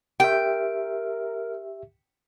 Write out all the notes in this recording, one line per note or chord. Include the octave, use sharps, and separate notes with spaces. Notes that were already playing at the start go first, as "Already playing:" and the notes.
G4 A#4 E5 G5